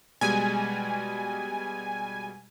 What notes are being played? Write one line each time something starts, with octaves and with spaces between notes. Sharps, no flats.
B2 G3 G#3 G#5